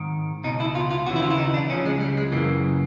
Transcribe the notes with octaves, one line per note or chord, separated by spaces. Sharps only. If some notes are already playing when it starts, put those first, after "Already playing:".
Already playing: G#2 D#3
C#2 B2 D#4
E4
F4
F4
D#2 C#3 E3 F#4
E4
F4
E4
D#4
D4
C#2 C#3 F3 C#4
G#3
G3
G#3
F#2 C#3 E3 A#3